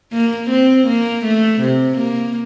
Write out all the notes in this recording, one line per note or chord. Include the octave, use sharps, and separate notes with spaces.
A#3
C4
A#3
A3
C3
A#3